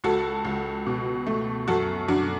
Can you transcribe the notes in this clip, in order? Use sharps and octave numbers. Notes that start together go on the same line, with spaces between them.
C#2 F#4 A4
C#2
B2
A3
F#2 F#4 A4
F#2 D4 F#4